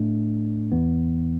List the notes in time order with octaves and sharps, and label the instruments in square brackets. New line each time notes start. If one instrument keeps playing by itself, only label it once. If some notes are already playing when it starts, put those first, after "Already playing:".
Already playing: [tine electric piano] A2 A3 D4
E2 E3 B3